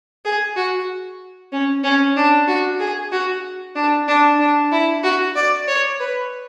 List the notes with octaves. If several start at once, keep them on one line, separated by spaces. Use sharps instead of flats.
G#4
F#4
C#4
C#4
D4
F#4
G#4
F#4
D4
D4
D4
E4
F#4
D5
C#5
B4